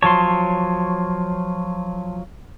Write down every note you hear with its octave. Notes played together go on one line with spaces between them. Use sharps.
F3 F#3 C#5 A5 C6